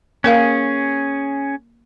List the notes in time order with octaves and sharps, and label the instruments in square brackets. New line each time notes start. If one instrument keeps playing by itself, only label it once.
[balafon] A#3 A#4 F5 [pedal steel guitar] C#4 G#4